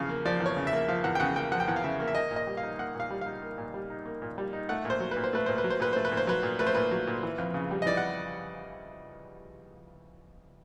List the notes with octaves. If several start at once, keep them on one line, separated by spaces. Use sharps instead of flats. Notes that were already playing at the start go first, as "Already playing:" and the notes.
Already playing: E2 C#3 F3 F5
A#3
F3 D5
E2
C#5
C#3
E5
A#3
F3 F5
E2 F#5
G5
C#3 F#5
A#3 G5
F3 F#5
G5
E2 F#5
F5
C#3 E5
A#3
E5
A#3 D#5
A#2
D#5
G3
F5
D#4
A#3 F#5
A#2
F5
G3
D#4 F5
A#3
A#2
G3
D#4
A#3
A#2
G3
D#4
A3 F#5
A#2
C5
F#3
B4
A#2
C5
A3 B4
A#2 C5
B4
F#3
C5
A#2 B4
A3 C5
B4
A#2
C5
F#3 B4
A#2
A3 B4
C5
A#2 B4
F#3
A#2
E3
F2
C#3
G3
D#5
E3 D5
F#5